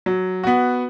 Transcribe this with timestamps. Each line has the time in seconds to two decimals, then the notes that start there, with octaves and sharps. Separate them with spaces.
0.06 F#3
0.44 B3 F#4